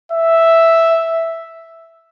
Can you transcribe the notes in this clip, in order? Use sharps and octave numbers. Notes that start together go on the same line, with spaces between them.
E5